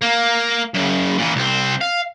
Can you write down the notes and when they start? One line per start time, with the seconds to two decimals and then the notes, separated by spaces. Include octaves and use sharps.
0.02 A#3
0.74 F#2 C#3
1.18 A#2 E3
1.36 C2 C4
1.81 F5